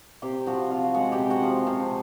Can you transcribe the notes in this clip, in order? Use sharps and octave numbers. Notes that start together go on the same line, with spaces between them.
C3 G4 G5
F3 F#4 F#5
C3 F4 F5
G#3 F#4 F#5
G4 G5
C3
F#4 F#5
F3
C3